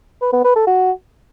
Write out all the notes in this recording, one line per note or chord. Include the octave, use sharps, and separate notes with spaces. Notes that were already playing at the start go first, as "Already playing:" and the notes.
B4
B3
B4
A4
F#4